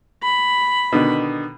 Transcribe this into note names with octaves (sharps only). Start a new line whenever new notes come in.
B5
B2 D3 D#3